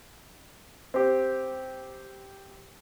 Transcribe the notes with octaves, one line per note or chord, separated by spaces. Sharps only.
C4 G4